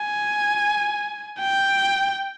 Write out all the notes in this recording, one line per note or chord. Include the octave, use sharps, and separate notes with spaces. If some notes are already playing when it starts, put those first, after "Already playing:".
Already playing: G#5
G5